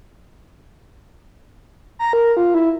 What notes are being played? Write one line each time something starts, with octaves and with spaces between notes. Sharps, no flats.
A#5
A#4
F4
E4